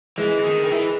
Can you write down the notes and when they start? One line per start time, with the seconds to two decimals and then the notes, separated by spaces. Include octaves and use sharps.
0.18 E3 G#3
0.46 D#3
0.64 D#3
0.72 E3